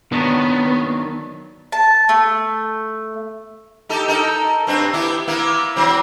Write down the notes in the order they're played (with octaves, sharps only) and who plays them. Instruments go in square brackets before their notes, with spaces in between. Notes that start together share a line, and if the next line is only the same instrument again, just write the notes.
[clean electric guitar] D#3 F#3 D4 [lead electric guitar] B3
[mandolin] A5
A3
[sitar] D#4 G4 A4
D#4 A4 A#4
G2 C4 B4
B3 E4 G4
A#3 B3 E4
E3 F#3 C4